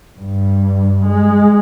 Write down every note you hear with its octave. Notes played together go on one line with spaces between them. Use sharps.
G2
G#3